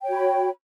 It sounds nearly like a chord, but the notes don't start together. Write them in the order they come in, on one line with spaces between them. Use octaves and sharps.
G5 C#5 F#4 B5